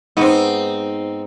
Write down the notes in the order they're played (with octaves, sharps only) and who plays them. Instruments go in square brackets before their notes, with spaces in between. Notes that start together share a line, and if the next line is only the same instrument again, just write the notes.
[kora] G#2 B3 [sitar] C4 D#4